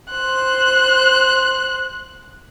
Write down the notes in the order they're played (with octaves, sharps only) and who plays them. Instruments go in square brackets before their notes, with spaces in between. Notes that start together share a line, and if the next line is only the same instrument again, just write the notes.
[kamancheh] C5 F#6